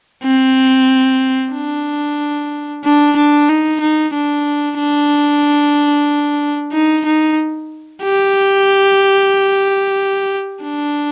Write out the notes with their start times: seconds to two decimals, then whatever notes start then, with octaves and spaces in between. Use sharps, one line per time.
0.24 C4
1.53 D4
2.84 D4
3.17 D4
3.49 D#4
3.80 D#4
4.14 D4
4.79 D4
6.73 D#4
7.06 D#4
8.03 G4
10.63 D4